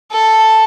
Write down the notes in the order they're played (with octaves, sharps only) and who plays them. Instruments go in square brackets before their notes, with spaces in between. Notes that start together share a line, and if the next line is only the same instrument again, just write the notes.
[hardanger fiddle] A4